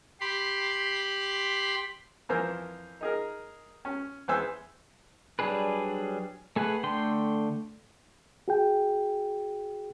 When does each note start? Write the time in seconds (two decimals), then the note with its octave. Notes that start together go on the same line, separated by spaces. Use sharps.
0.20 G4 B5 C6
2.29 F2 E3 A#4 C5 G#5 E6
3.01 D#4 G#4 A#4
3.85 C#4
4.28 E2 B4 C5 G#5 E6
5.39 F#3 G3 D4 G#4 B4
6.56 A3 G#4 B4 F#5
6.83 D3 A3 G5 C6
8.48 F#4 G#4 G5